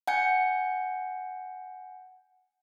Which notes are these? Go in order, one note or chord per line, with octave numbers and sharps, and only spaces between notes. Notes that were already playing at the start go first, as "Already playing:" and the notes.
F#5 G#5 G6 C#7